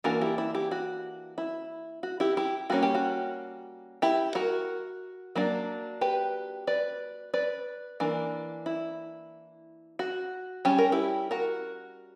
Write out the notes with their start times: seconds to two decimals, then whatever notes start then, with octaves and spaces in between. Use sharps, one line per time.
0.04 E3 A#3 D4 F#4 A#4
0.21 E4 G4
0.38 E4
0.55 E4 G4
0.71 F#4
1.38 E4
2.03 F#4
2.20 E4 G4
2.37 E4 G4
2.70 G3 A#3 C#4 F#4
2.83 G4
2.94 F#4
4.02 E4 G4
4.35 F#4 A#4
5.35 F#3 A#3 D4
6.01 G4 B4
6.67 B4 D5
7.34 B4 D5
8.00 E3 A#3 D4
8.66 E4
9.99 F#4
10.65 G3 C#4 G4
10.78 A#4
10.92 E4 G4
11.31 F#4 A#4